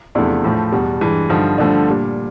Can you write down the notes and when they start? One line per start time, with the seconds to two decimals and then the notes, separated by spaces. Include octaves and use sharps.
0.15 E2 C3 F3 A3 D4 E4
0.44 A2 F3 A3
0.72 E2 B2 G3
1.01 G2 E3 G#3
1.29 G2 D3 F3 D#4
1.58 G2 D3 F3 A3 D4
1.87 A#2 G3